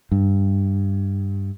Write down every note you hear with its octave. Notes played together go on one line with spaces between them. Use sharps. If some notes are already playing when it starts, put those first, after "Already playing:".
G2